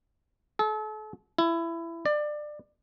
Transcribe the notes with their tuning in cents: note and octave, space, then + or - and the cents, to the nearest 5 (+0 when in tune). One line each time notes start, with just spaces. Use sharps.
A4 -40
E4 +20
D5 +25